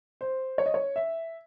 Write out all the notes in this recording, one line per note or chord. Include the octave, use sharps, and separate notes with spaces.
C5
C#5
D#5
C#5
E5